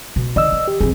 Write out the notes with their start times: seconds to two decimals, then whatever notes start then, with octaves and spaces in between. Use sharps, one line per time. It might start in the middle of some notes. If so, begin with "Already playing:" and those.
0.16 B2
0.36 D#3 D5 D#5 E6
0.52 E3
0.68 G4
0.80 C2 F2 G#4